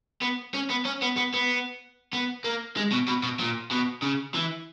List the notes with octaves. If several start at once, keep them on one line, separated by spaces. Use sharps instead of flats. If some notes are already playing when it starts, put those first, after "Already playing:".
B3
C#4
B3
C#4
B3
B3
B3
B3
A#3
G#3
B2
B2
B2
A#2
B2
C#3
E3